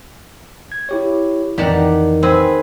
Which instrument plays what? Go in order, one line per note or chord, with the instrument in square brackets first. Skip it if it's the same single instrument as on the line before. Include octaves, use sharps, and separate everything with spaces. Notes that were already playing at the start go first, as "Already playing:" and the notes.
[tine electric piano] G#6
E4 G4 C#5
[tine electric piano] F2 E3 [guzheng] D#3 F#5 A#5 [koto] G4 D5 A5
[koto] C4 [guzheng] G#4 B4